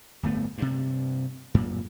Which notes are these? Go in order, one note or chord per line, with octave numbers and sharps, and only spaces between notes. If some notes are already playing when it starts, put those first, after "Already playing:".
D1 G1 A3 B3
G2 C3
F#2 A#2